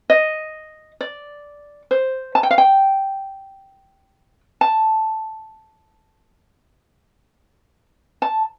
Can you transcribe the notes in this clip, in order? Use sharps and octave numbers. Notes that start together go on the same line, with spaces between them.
D#5
D5
C5
A5
G5
F5
G5
A5
A5